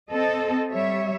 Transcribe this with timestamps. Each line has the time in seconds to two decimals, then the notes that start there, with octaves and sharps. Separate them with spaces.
0.10 C4 A4 D#5
0.72 G3 C#5 E5